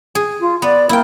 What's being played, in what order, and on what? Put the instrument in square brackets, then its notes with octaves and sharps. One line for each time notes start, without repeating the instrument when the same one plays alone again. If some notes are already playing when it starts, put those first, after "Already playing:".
[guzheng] G#4
[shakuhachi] F4
[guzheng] B3 [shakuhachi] D5
[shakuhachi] A#3 [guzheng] E4 G5